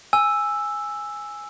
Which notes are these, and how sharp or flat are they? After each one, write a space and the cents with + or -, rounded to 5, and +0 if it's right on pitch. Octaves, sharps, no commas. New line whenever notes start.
G#5 -5 E6 +0